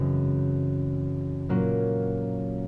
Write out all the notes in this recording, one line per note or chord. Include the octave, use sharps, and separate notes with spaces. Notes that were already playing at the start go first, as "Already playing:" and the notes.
Already playing: F#2 C#3 E3 G#3 C4
A#2 F#3 A#3 C#4 F4